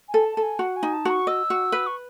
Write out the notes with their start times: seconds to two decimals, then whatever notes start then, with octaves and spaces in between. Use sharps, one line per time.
0.08 G#5
0.14 A4
0.25 A5
0.37 A4
0.42 G#5
0.59 F#4 F#5
0.76 G#5
0.83 D#4
0.93 A5
1.05 F#4 C#6
1.27 D#5 E6
1.50 F#4
1.72 B4
1.86 C#6